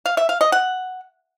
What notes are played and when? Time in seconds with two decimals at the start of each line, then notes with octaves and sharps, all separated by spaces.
0.06 F5
0.17 E5
0.29 F5
0.41 D#5
0.52 F#5